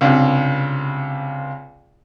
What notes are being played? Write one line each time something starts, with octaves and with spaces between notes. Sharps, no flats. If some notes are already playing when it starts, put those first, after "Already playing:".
C#2 G2 C3